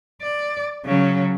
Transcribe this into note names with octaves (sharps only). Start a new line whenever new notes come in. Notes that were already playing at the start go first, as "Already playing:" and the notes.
D5
C#3 F#3